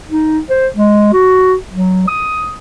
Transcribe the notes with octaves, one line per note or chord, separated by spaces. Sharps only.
D#4
C5
G#3
F#4
F#3
D#6